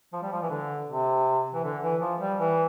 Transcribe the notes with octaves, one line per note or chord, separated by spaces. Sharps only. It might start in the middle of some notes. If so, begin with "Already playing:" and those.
F3
G3
F3
E3
D3
C3
E3
D3
E3
F3
G3
E3